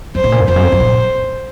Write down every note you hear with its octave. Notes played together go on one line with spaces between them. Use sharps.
F#2 C5
A2
A#2
F#2
F2 C5
F#2
F2
F#2
A#2